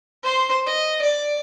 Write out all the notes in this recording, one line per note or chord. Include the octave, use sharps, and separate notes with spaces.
C5 C6
D#5
D5